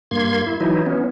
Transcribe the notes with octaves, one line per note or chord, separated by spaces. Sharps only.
G2 A#3 C6 G#6
E4
E3 F#3 D#4 E4
B3 C#4